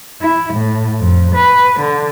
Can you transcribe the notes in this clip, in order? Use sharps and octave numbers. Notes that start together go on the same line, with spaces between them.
E4
A2
F2
B4
D3